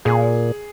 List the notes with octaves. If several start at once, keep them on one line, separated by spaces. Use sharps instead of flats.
A#2 G#4